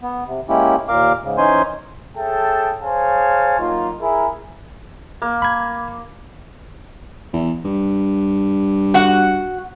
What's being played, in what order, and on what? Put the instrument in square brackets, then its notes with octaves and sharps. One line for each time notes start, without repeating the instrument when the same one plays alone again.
[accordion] B3
C3
G#3 A#3 C#4 E4 G4
D#2 A#2 A#4 F5 D6
G#2 C#3
E3 C#4 D#4 C5 G#5 C6
[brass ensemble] G#4 A4 C#5 E5 G5 A5
G#4 C5 C#5 F5 G#5 A5
F#3 A#3 D#4 F4
E4 G#4 A#4
[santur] A#3
[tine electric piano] B5 G#6
[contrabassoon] E2
G2
[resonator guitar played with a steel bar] F#4 F#5